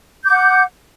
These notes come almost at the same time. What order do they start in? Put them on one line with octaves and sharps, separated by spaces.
G6 D6 F#5